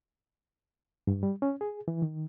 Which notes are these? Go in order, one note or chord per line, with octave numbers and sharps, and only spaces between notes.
G2
G3
C#4
G#4
E3
D#3